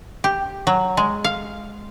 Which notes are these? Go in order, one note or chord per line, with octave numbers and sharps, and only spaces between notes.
G4
F#3
G#3
F5